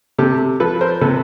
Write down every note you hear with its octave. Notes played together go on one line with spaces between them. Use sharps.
C3 G4 A4
F3 A4 B4
A#4 C5
C3 A4 B4